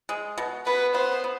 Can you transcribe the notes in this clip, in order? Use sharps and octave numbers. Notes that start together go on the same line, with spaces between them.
G#3
B2
B3 B4
B3 C5
B3